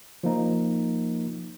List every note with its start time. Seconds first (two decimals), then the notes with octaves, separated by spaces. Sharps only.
0.23 F3 A#3 D#4